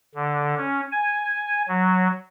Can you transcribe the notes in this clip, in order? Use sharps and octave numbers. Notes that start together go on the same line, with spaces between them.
D3
C#4
G#5
F#3